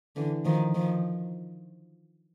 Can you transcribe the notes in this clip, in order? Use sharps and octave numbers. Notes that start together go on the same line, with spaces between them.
D3 E3
D#3 F3
D#3 F3